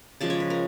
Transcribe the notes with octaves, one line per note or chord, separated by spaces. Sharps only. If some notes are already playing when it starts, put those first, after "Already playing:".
C#3 F3 G#3 D5
C#5
B4
A#4